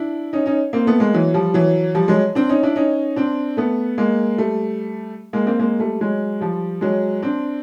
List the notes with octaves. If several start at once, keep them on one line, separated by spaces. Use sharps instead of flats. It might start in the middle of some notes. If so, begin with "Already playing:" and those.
Already playing: D4 E4
C#4 D#4
C#4 D#4
A#3 C4
A3 B3
G#3 A#3
E3 F#3
F3 G3
E3 F#3
F3 G3
F#3 G#3
C4 D4
C#4 D#4
D4 E4
C#4 D#4
C4 D4
A3 B3
G#3 A#3
G3 A3
G#3 A#3
A#3 C4
G#3 A#3
G3 A3
F#3 G#3
F3 G3
F#3 G#3
C4 D4